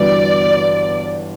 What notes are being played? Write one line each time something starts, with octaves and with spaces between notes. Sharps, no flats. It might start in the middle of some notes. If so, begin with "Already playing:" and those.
Already playing: G1 G2 E3 B3 F#4 D5